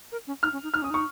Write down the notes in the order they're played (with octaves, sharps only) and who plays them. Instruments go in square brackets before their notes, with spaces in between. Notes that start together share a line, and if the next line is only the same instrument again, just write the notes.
[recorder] A#4
C#4
[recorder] D#4 [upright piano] F6
[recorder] C#4
D#4
[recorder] D#4 [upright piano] F6
[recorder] C#4 [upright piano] D#6
[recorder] D#4 [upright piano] C#6